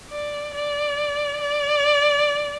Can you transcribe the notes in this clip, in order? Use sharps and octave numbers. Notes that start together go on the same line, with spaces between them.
D5
D5
D5